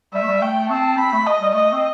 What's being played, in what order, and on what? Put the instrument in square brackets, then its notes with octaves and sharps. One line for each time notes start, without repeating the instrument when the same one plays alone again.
[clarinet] G3 [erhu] E5
[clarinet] A3
G3
[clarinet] A3 [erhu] G5
[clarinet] C4 [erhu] A5
[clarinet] C4 [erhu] B5
[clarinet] A3
[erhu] D#5
[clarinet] G3
[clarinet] A3 [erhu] D#5
[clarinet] C4